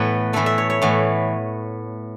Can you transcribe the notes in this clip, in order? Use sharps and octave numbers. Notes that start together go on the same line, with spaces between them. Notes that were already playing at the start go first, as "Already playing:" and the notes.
Already playing: A2 E3 B3 B4
A2 E3 A3 E5
E5
C#5
C#5
A2 E3 B3